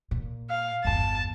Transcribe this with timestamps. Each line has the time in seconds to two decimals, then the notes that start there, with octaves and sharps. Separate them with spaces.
0.11 A#2
0.50 F5
0.85 G1 E2 A5